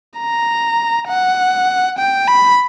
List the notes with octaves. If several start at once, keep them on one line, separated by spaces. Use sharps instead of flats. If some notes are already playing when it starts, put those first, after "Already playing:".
A#5
F#5
G5
B5